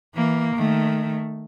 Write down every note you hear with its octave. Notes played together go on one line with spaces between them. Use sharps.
E3 A#3
D#3 A3